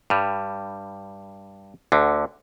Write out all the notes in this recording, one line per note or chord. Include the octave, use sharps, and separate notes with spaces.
G2 G3
D2 D3